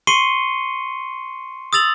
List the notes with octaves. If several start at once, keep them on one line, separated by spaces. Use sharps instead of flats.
C6 C#6 C7 C#7 D#7 G7
D#6 E6 A6 F7 F#7